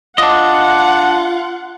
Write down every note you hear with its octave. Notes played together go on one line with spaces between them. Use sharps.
D4 F4 D#5 F#5